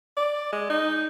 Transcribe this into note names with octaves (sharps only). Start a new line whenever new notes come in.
D5
G#3
D#4